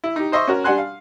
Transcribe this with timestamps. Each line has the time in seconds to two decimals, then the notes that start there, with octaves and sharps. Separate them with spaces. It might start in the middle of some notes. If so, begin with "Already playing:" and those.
0.04 E4
0.16 D#4 G4
0.32 C5 D#5 E5 C6 C#6
0.47 C#4 F#4 A#4
0.64 G3 D4 F#5 G#5 C6 F#6
0.78 F5